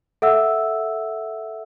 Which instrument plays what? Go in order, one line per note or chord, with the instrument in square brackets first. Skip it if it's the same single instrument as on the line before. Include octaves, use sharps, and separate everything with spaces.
[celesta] A4 E5 F#5 E6